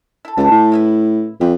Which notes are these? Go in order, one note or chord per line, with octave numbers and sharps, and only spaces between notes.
E4 A4
C#2 E3 A3 A4
A2
C#3 E4 B4
F2 E3 G4